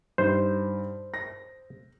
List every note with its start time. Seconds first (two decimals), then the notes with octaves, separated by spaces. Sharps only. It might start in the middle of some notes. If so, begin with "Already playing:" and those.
0.18 G2 D#4 C5
1.14 A#6